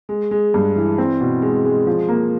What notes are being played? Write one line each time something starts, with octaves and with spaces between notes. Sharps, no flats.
G#3
G#3
G2
E3
C4
B2
G#3
G#3
F3
A#3